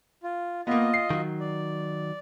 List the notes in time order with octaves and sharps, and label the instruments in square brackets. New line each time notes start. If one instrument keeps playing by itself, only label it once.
[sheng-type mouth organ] F4
[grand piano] A#3 B3 [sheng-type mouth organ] F4 D#5
[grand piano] C7
[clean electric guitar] D#3 F#3
[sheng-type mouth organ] D5